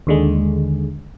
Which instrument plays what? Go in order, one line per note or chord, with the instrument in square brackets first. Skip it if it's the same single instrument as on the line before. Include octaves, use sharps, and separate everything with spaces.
[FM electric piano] D#2 D3 G#3